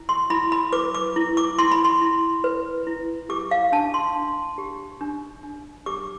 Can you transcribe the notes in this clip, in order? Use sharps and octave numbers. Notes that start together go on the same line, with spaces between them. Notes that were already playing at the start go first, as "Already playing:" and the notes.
Already playing: E4
C6
E4 B5
B5
B4 D6
D6
E4
D6
E4 C6
B5
C6
E4
B4
E4
G4 D6
F5
D4 A5
C6
D4
G4
D4
D4
G4 D6